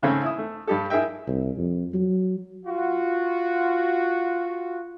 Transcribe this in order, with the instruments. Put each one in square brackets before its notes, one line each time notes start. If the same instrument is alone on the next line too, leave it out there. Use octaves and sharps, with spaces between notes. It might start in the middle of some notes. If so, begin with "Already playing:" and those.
[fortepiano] G#2 C#3 A3 C4 C#4
E4 D#6
A3
G2 G4 A4
E4 G#4 A#4 E5 G5
[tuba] C2
F2
F#3
[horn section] F4 F#4